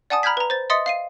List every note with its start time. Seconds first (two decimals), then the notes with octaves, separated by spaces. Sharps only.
0.10 D5 F#5 G#5 A5 D#6
0.23 A#5 B5 F6 G6 G#6 B6
0.37 B4 A#5
0.50 C5 A6
0.70 D#5 E5 C6 D#6 A6 C#7
0.86 F5 C7 D#7